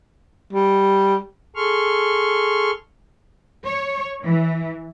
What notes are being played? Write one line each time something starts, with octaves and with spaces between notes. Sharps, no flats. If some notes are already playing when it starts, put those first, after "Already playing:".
G3
G#4 A4 C6 C#6 F6
C#5
E3